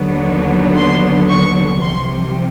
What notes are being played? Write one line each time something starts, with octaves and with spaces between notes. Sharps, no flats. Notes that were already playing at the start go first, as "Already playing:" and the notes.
Already playing: D#2 D3 F#3 B3
C6
C#6
C2 C3 F3 C6